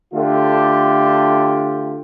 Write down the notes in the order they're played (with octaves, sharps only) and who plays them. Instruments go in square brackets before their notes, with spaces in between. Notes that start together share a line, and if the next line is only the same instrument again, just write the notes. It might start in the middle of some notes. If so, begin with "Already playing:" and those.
[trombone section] D3 A3 F4 G4